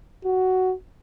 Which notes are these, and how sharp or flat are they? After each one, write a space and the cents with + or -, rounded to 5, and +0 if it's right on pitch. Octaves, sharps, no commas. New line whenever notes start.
F#4 +10